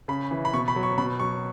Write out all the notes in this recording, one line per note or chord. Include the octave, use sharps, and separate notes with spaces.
C#3 B5
E3
B5
B2 C#6
B5
F#3
C#6
B2 B5
F#3 C#6